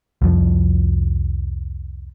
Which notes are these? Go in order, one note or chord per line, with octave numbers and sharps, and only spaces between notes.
C2 F2 F3